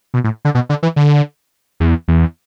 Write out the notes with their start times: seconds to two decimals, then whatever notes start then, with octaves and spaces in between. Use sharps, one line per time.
0.14 B2
0.24 A2
0.45 D3
0.55 B2
0.69 D3
0.83 E3
0.96 D3
1.80 E2
2.08 E2